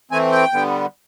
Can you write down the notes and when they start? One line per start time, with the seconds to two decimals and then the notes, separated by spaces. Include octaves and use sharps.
0.11 E3 A3 C4 G#5
0.32 G5
0.53 D3 G3 B3